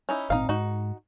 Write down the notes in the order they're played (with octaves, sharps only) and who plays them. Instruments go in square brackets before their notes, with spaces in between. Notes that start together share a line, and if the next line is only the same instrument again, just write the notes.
[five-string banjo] C#4 D#4 E4
[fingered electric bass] G#1 A#2 C4 [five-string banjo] D#4 F5
[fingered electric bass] G#2 [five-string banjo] D#4 F#4